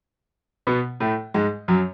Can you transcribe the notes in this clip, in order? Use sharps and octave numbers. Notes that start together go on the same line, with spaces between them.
B2 B3
A2 A3
G#2 G#3
F#2 F#3